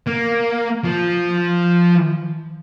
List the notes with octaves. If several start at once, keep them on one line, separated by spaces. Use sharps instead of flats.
A#3
F3